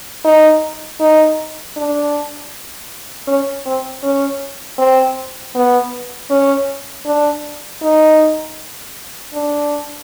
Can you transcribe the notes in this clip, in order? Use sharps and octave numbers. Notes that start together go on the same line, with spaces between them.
D#4
D#4
D4
C#4
C4
C#4
C4
B3
C#4
D4
D#4
D4